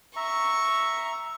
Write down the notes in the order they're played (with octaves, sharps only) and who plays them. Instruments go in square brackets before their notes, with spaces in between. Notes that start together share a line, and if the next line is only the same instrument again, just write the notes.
[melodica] E5 A#5 [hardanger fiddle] C#6